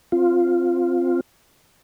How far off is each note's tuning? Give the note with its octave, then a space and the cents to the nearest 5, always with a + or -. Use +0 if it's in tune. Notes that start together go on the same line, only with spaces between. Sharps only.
C4 +0 F4 +0